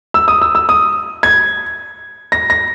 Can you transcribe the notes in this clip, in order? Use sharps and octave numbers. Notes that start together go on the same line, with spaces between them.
E6
D#6
E6
E6
D#6
G#6
A#6
A#6